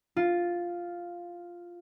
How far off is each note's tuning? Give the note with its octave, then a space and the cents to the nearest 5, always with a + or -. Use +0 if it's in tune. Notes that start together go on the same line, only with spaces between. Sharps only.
F4 +0